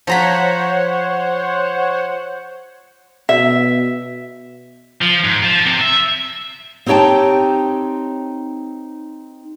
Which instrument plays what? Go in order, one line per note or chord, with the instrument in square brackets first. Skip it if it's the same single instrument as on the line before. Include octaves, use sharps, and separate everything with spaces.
[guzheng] F3 A#5 B5 [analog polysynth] C5 C#5 F#5
[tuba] B2 [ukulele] E5
[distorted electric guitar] F3
G#2
F3
C3
E5
[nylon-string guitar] C4 D#4 G4 C#5 G5 A5